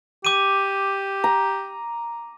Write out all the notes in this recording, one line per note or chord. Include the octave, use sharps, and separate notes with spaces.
G4 D6 D#7
A#5